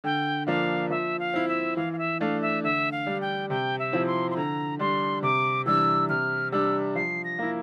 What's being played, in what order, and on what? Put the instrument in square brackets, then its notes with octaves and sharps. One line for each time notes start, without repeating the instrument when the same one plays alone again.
[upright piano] D3 [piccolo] G5
[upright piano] F3 A#3 D4 [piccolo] F5
[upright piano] F3 [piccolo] E5
[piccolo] F5
[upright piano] C4 E4
[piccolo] E5
[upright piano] E3 [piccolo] F5
[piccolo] F5
E5
[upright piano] A3 D4 [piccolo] F5
[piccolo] E5
[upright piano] D3 [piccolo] E5
[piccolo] F5
[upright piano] G3 D4
[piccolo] G5
[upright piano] C3 [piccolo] G5
[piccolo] E5
[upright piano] F3 C4 E4
[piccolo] C6
C6
[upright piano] D3 [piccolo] A#5
[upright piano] G3 D4 [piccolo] C6
[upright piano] C3 [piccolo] D6
[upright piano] E3 G3 D4 [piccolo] E6
[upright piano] C3 [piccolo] F6
[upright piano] G3 D4 [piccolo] E6
[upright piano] F3 [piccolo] C7
[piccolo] A#6
[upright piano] A#3 E4